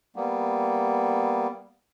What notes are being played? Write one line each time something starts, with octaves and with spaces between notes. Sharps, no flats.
G3 A#3 B3